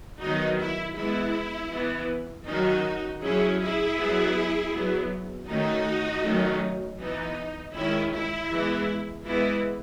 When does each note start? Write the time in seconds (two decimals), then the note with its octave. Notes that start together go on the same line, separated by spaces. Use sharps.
0.21 D#3 F#3 B3 D#4 F#4
0.60 E4
0.97 E3 G#3 B3 E4
1.73 E3 B3
2.48 D#3 F#3 C#4 D#4 F#4
3.23 F#3 C#4 E4 G#4
3.60 E4 G#4
3.99 F#3 B3
4.73 F#3 B3
5.49 D#3 A3 C#4 D#4 F#4
6.24 D#3 F#3 A3 C#4
7.01 E3 B3 D#4
7.75 D#3 G#3 C#4 E4
8.13 E4
8.51 E3 G#3 B3
9.26 E3 G#3 B3 E4